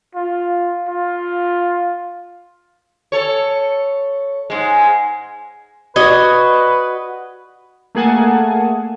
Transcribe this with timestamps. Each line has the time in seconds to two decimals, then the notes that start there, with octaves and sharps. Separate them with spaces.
0.15 F4
0.88 F4
3.12 A4 C#5
4.50 G#2 G#3
5.96 F#4 B4 D5 D#5 G#6
7.95 A3 A#3 G#4 F#5 G#5 A5